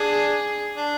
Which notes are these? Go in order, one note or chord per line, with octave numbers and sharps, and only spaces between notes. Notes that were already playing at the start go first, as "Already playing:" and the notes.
Already playing: D4 G#4
D4